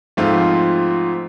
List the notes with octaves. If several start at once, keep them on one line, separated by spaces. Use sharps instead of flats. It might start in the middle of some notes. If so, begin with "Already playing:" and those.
G#2 F3 A3 C4 F4